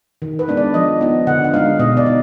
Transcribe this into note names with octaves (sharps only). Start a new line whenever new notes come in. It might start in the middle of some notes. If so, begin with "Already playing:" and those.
D#3
B4
G#3 B3 D4
D5
F3 D#5
B3 D#4
D3 F#5
F#5
G#3 D#4 F5
B2 D#5
D5
D#4